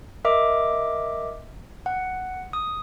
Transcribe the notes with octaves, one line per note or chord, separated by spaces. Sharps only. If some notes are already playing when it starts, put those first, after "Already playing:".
A#4 D#5 E5 D6
F#5
D#6